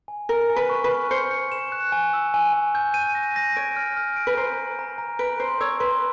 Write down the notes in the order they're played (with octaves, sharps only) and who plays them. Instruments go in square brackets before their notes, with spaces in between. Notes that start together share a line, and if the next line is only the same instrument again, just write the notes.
[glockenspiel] G#5
[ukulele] A#4 [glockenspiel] F6
[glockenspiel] G#5
[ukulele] B4
[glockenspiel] C#6
[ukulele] B4
[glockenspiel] F6
[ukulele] C5 [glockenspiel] C#7
[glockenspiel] C#7
E7
F#6
G#5
E6
G#5
G#5
G6
D#7
A#6
A#6
[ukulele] C#5 [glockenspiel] D7
[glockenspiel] F6
F6
D7
[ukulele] B4
[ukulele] C5 [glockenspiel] A#5
[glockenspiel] A#5
A#5
A#5
[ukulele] B4 [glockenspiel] D7
[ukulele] C5 [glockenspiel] C6
[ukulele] C#5 [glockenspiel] E6
[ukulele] B4 [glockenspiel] C6